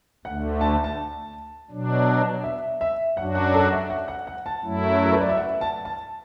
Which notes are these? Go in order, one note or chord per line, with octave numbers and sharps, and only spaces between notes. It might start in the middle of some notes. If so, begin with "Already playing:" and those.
D2 D3 A3 F#5
A5
A5
B2 F#3 D4
E5
E5
F#2 F#3 D4 F#4 F#5
F#5
A4
E5
F#5
F#5
F#5
A5
F#2 F#3 A3 E4
A4
B4
D5
E5
F#5
A5
A5